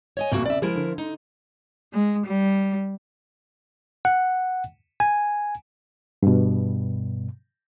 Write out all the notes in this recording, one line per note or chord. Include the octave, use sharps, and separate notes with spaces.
C#5 D#5 G#5
C2 F2 B2 A3 A#3 F#4
C#3 D5 E5
F3 G#3 E4 A#4
D3
D#4
G#3
G3
F#5
G#5
G2 B2